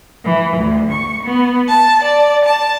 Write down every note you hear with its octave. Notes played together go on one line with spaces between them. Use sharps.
E3
D2
C#6
B3
A5
D5
A5